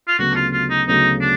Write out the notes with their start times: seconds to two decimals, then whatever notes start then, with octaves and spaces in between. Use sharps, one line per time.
0.07 F4
0.18 D2 C#3 F#3 B3 F#4
0.35 F4
0.53 F4
0.70 D#4
0.87 D2 C#3 F#3 B3 D#4
1.20 D4